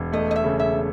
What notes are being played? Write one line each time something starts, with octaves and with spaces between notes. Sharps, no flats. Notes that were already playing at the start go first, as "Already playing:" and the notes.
Already playing: E1
A3 D#5
D#5
E5
C#3
E5